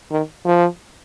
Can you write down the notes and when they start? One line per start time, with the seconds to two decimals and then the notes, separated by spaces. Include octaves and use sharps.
0.11 D#3
0.45 F3